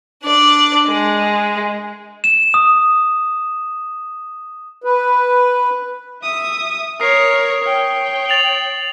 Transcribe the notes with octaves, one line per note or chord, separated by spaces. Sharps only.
D4 D5
G#3
E7
D#6
B4
E5 D#6
A#4 C#5 D#6 C7
C#5 G5
A6 F7 F#7